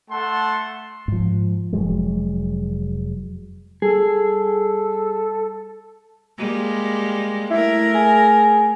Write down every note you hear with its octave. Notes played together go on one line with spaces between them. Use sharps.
A3 A4 F#5 A5 C6
G#2 F3
F1 F3 F#3 G#3
G3 G#4 A4
G3 G#3 A#3
A3 E4 A#4
G#4